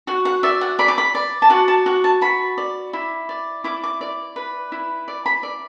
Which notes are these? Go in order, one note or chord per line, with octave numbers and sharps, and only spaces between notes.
F#4 F#5
F#5
D5 E5
F#5
D5 B5
D6
B5
D5
A5
F#4 F#5
A5
F#4 F#5
A5
F#4 B5
D5
E4
D5
E4 D6
D6
D5
B4
E4
D5
B5
D5